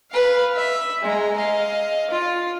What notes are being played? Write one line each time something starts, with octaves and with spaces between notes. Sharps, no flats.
B4 F5
E5
G#3 A#5
D#5 F5
F4 F5